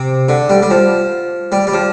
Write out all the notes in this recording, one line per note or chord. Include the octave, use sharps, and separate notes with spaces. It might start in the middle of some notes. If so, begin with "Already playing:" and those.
Already playing: C3
D3
G3
G3
F3
G3
G3
F3